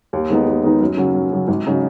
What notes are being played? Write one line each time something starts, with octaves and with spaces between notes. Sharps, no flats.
D#2
D#3 G#3 B3 D#4
D#2
D#3 G#3 B3 D#4
F#2
C#3 F#3
F#2
C#3 F#3
G#1
C#3 F#3 D#4